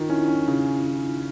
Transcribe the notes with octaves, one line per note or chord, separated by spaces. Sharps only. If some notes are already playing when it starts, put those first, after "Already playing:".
Already playing: D#3 D#4 F4
C#4 D4 E4
C#4
C#3